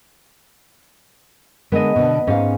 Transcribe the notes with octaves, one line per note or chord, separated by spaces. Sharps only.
D3 G#3 B3 A#4 D#5
B2 D3
G#2 C#4 F5